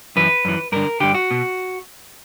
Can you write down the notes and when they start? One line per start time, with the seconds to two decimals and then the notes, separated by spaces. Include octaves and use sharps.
0.16 F#2 E3 B4
0.45 F#2 E3
0.72 G2 D3 A#4
1.00 G2 D3 G4
1.15 F#4
1.31 B2